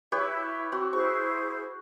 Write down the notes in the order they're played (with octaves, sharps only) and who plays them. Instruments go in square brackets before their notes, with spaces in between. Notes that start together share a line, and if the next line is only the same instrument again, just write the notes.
[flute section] E4 E5 [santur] G4 B4 C#5
[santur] C4 F#4
[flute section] E4 G#4 C5 [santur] C#6